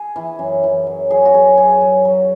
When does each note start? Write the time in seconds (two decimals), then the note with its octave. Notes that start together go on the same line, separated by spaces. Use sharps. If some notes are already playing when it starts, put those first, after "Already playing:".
Already playing: G#4
0.16 E3
0.39 F#2
0.63 E3
0.87 F#3
1.10 F#3 G#4
1.25 F#4
1.34 F#3 G#4
1.57 F#3 G#4
1.81 F#3
2.05 F#3